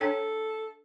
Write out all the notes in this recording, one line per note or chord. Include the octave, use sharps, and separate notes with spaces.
D4 A4 C#5 G5